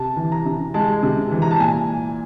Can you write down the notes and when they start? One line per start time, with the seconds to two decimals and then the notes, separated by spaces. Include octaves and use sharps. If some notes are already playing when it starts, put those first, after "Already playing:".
Already playing: C3 A5
0.16 E3
0.32 A#5
0.46 C3
0.74 G#3 A5
1.03 C3
1.31 E3
1.42 A#5
1.51 A5
1.60 A#2 G#5